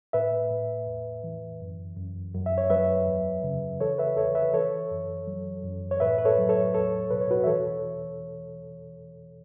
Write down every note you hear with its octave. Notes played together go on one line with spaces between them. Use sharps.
A2 B4 E5
A2
E2
E3
F#2
F#2
F#2
E5
C#5
F#3 B4 E5
E2
C#3
E3 A4 C#5
B4 E5
E2 A4 C#5
B4 E5
E3 A4 C#5
F#2
F#3
F#2
C#5
A2 B4 E5
B4
A4 C#5
F#3
A4 C#5
E2 A4 C#5
B2 B4
C#5
F#4 B4
E5
E3 A4 C#5